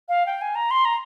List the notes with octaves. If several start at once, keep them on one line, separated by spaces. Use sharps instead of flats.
F5
G5
G#5
A#5
C6
A#5